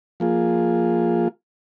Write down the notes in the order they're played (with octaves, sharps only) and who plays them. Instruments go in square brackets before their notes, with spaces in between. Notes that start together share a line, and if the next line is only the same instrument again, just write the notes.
[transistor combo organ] F3 A#3 F4 G#4